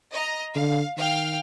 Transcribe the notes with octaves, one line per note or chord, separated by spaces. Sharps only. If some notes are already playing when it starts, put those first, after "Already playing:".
D#5 A#5
D3 F5
D#3 F5 G5 F6